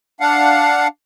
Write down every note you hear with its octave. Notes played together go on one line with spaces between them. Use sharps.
D4 F5 F#5